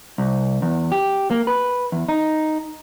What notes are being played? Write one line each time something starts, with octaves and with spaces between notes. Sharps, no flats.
C2
E2
G4
A#3
B4
E2
D#4